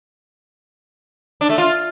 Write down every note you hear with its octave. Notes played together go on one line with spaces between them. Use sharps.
D4
A3
F4